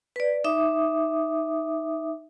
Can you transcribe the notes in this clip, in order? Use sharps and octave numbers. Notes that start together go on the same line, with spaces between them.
B4 D5
D#4 E5 D6 D#6